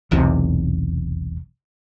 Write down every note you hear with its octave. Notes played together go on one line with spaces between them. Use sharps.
F1 B1 E2 C3